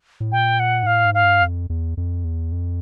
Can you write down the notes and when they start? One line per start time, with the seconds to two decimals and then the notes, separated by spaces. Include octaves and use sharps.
0.20 A2
0.32 A#2 G5
0.60 F#5
0.83 G#2
0.86 A2 F5
1.05 G#2
1.14 F5
1.24 G2
1.42 F2
1.70 E2
1.97 F2
2.24 E2
2.52 F2